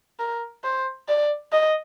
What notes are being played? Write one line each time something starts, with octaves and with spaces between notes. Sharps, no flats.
A#4
C5
D5
D#5